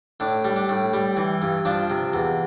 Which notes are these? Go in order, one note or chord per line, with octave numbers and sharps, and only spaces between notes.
A2 D4
G3
D4
A2
G3
E3
G2
F3 D4
C3
E2